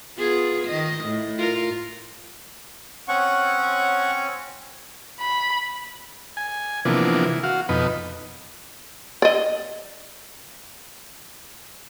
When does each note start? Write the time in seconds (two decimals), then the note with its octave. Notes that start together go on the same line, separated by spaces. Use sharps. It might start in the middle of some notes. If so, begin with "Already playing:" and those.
0.17 B3 F4 G#4
0.65 D#3 D#5
1.04 A2
1.38 F4 A#4
3.08 C4 C#4 C#5 F#5 C#6
5.20 B5
6.37 G#5
6.85 C3 E3 F3 A#3 B3 D4
7.25 E3
7.43 F#4 F5
7.69 F2 B2 D#4 B4
9.22 D5 D#5